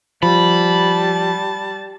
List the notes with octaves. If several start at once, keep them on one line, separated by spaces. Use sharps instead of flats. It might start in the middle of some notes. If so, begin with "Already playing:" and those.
F3 G3 A5 B5